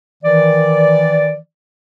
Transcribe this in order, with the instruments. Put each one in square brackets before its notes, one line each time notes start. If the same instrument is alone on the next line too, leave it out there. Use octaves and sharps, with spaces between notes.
[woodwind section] D#3 E3 D5